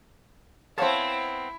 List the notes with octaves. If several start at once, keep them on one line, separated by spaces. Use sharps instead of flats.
B3 C4 E4 C#5 F5 A5